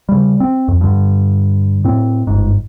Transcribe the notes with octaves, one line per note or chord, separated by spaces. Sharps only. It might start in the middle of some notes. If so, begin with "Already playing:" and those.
C#3 G3
C4
F2
G2 D3
A2 C4
G1 G#2